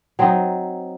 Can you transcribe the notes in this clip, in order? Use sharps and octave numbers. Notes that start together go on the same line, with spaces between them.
F#3 C4 D#4